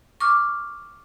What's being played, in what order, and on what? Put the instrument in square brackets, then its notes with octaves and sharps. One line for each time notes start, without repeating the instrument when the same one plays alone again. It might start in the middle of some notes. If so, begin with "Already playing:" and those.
[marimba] C#6 D6 F6